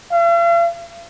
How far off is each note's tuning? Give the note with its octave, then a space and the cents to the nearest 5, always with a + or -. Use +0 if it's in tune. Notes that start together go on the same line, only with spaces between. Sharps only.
F5 -45